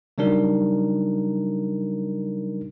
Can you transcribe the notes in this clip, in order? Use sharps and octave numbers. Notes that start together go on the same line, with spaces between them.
C#3 F#3 G3 D4 D#4 A#4